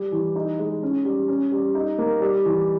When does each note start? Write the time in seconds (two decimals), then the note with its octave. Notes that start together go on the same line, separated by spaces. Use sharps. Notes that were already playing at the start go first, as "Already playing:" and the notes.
Already playing: G3
0.12 E3
0.36 D#4
0.59 G#3
0.83 C#4
1.05 G3
1.28 C#4
1.52 G3
1.75 D#4
1.98 A#3
2.21 G3
2.45 E3